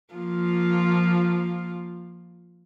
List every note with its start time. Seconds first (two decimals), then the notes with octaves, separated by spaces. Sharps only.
0.14 F3 A#3 F4